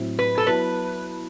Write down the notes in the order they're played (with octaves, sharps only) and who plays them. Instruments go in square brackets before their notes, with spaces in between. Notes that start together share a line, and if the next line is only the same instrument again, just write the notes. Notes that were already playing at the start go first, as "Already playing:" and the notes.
Already playing: [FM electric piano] A2 F#3 C4 E4
[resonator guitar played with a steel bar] B4
A4
[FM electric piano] F#3 B3 E4 [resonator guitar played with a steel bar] B4